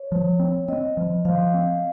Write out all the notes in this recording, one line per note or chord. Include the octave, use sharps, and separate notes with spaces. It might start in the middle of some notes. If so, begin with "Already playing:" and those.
Already playing: C#5
F3
C4
C4 D#5
F3
F3 F5
C4